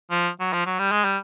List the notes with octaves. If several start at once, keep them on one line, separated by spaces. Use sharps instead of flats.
F3
F#3
F3
F#3
G3
G#3
G3